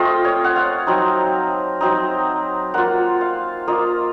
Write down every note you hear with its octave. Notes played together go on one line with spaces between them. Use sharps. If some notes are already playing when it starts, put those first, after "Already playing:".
Already playing: A3 C4 F4 D#5 F5
C#5
F#5
F5
F#3 C4 D#4
F#3 C4 D#4
A#3 F4 F#5
F5
A#3 F4 D#5